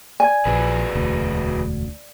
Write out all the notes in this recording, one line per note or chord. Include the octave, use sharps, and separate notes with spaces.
D5 G#5 G#6
A#1 C#3 F3 F#3 G#4 B4
E1 D2